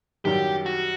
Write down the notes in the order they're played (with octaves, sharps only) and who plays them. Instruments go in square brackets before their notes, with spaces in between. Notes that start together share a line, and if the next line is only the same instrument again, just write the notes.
[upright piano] F#2 D#3 G3 [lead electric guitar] G4
[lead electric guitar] F#4